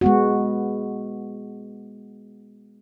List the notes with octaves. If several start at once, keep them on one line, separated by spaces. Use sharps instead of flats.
G#3 B3 F#4